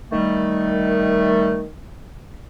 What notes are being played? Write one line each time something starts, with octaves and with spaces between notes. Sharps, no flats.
D#3 G3 A3